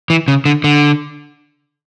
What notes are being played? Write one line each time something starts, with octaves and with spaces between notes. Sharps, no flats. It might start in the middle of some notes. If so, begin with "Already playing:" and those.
E3
C#3
D3
D3